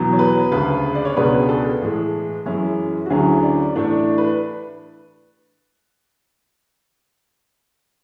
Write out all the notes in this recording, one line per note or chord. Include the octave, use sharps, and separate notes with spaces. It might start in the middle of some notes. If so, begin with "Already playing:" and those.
Already playing: E2 B2 F#3 B3
C#5
B4
D2 C#3 G#3 B4
D5
C#5
C#2 B2 G#3 B3 D4 B4
G#4
A4
A2 E3 G#3
F#2 E3 G#3 C#4 E4
F#4
D2 D3 F#3 C#4 E4 G#4
D5
A2 E3 A3 D4
B4